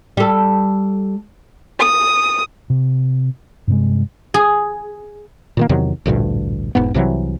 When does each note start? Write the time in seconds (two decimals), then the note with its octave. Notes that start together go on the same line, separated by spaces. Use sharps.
0.17 G3 A4
1.80 D#6
2.70 C3
3.68 G2 C3 G#3
4.34 G#4
5.57 A#2 D#3 A#3
5.69 E2 C3 D#3 F#3
6.06 A1 D2 G2 A#2
6.75 E1 G#2 B3
6.94 C2 C3 E3 F#3